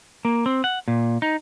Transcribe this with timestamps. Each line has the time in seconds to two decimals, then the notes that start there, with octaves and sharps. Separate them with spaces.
0.25 A#3
0.46 C4
0.64 F#5
0.88 A#2
1.22 D#4